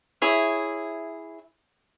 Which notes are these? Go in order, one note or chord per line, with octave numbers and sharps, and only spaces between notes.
E4 G#4 C#5 E5